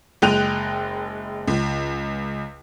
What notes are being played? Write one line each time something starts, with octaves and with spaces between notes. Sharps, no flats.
F#1 G#3 G5 F#6 D#7 F7
C#2